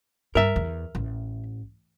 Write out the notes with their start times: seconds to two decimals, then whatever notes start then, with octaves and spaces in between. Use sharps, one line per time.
0.35 G2 A#4 E5
0.56 E2
0.95 A1